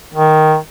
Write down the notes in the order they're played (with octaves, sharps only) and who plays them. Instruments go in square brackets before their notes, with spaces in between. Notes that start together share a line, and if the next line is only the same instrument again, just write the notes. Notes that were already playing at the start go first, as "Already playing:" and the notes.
[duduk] D#3